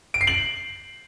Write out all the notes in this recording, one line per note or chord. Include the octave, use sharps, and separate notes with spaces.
D7
C7
F#7